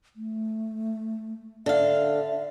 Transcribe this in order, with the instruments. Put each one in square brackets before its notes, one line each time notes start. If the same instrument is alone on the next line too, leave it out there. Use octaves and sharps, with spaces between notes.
[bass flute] A3
[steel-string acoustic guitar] D3 F5 [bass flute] E5